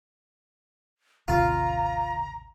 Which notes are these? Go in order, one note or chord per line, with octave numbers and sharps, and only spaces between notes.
A1 D#2 C3 F4 A#5